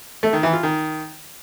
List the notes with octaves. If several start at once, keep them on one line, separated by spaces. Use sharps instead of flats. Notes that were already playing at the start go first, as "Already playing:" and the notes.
A3
D#3
E3
F4
D#3